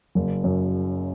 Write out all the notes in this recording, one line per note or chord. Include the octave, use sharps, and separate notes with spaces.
F#1
F#2